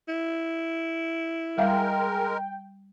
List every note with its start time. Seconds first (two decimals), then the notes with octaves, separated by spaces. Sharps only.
0.08 E4
1.58 G3 G#3 A#4 E5 F5 G5